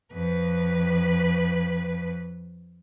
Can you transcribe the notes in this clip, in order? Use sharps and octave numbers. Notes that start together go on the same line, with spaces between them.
F2 B4